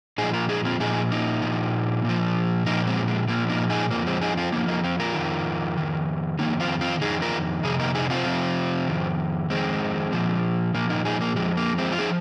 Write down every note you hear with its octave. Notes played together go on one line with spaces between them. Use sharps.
A#2 F3 D#4 G#4
F4 A#4
D#4 G#4
C4 F4
A#2 F3 D#4 G#4
A#3 D#4
A#2 F3
A#2 F3
A#2 F3 A#3 D#4
G#3 C4
G#3
A#2 F3 A#3
A#3 D#4
D#4 G#4
F2 F3 A#3
G#3 C4
D#4 G#4
C4 F4
F2 F3 A#3 D#4
A#3 D#4
C4 F4
F4 A#4
F2 D#3
F2 D#3
F2 D#3 A#3 D#4
C4 F4
C4 F4
F2 D#3 D#4 G#4
F4 A#4
F2 C3 G#4
A#3 D#4
D#4 G#4
C4 F4
F2 C3 F3
F2 D#3
F2 D#3 G#3 C4
A#2 F3
A#2 F3 A#3
A#3 D#4
D#4 G#4
A#3
F2 F3 G#3
A#3
G#3 C4
F4
F3 D#4 G#4